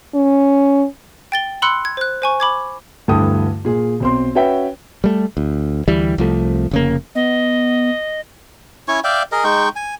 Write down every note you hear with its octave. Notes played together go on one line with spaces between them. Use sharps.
C#4
G5 A6 G7
B5 C6 E6 F#6 C#7
G#6
C5 F#6
C5 G#5 C#6
B5 D6 G#6
D2 G2 D3 E3 G5 D#6
A#2 G#4
B1 C4 C6
C#4 F#4 B4 E5 G5
G3 A3
D2
D2 E3 G3
C2 F3 A3
F1 C#3 A#3
B3 D#5
C#4 E4 C#5 C#6
D5 E5 F5 G5
G#4 A#4 D#5
G#3 D#4 G5 C#6
G#5